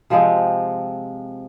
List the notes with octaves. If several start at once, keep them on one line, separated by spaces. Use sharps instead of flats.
C3 F3 G#3 C4